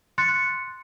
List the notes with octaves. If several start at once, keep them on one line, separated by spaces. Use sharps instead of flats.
C6 F#6 A6 C#7